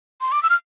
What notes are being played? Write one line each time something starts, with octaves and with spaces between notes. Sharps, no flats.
C6
D6
E6
F6